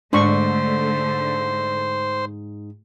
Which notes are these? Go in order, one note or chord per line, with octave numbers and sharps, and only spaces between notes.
G#2 D3 A3 D4 C5 C#6